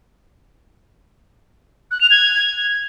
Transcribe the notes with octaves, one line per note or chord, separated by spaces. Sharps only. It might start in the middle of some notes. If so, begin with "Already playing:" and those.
F#6
F7
G#6